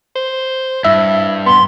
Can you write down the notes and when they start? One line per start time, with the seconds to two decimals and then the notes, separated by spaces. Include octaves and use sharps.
0.16 C5
0.85 G2 E4 E5
1.46 B3 C6